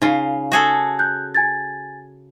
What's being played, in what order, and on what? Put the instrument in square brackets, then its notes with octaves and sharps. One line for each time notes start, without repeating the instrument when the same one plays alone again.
[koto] C#3 F4 [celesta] D#4
[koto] F#4 G#4 A4
[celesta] F#6 G6
G#5 G#6 A6